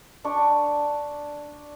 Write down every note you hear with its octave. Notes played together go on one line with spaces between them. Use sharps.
D4 C#6